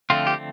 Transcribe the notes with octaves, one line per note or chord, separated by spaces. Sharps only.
D3 F3 A3 C4 F4
G4